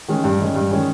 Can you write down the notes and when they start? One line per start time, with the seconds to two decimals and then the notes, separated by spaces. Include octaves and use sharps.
0.08 D#3 G#3 C#4
0.24 G2
0.39 D#3 G#3 C#4
0.55 G2
0.71 D#3 G#3 C#4